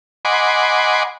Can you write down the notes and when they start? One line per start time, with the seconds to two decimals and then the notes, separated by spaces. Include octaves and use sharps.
0.25 D#5 F#5 G#5 B5 C6 D6